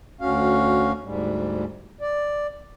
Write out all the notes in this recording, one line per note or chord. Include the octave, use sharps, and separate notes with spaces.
D2 C#4 F#4 F5
D2 G#2 G3
D5